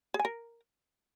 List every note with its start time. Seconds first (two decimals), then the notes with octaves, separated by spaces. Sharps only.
0.14 G#4
0.19 G#5
0.25 A#4